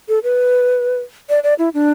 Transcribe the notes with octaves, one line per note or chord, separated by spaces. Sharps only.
A4
B4
D5
D5
E4
D4